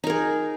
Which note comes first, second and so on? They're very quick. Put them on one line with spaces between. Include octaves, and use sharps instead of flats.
D#4 A#4 G#4